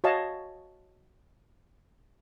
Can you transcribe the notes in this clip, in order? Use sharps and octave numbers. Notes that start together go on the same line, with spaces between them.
F#4 C#5 D#5 F5 A5